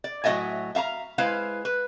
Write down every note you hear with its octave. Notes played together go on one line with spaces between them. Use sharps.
D5
A2 F#3 D4 D#5 E5 G#5
E5 F5 A5 A#5
G#3 E4 B4 C5 F5
B4